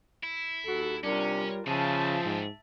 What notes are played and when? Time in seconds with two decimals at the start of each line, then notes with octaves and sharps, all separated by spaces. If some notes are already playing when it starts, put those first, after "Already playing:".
0.24 E4
0.66 D#2 F#4 A4
1.04 C3 G3 C#4 D4 F4 A#4
1.67 C#3 F3 C4 G#4 E5 A5
2.25 G#2